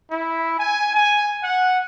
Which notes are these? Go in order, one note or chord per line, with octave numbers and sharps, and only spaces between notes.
E4
G#5
G#5
F#5